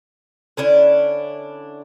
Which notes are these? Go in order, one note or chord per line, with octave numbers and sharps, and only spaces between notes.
D3 C#4 D4 E4